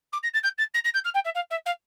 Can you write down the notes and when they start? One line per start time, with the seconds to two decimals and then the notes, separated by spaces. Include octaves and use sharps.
0.12 D6
0.23 A#6
0.34 A6
0.43 G6
0.58 A6
0.74 A#6
0.84 A#6
0.94 G6
1.04 F6
1.14 G5
1.24 E5
1.35 F5
1.50 E5
1.66 F5